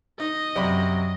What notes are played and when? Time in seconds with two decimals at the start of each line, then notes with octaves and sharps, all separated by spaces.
0.20 D#4 D#5
0.55 F#2 C3 F#3 D5 B5